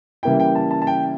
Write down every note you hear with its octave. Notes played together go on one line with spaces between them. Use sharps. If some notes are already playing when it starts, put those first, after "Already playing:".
C#3 E3 G3 A#3 E4 G5
G5
A5
A5
A5
G5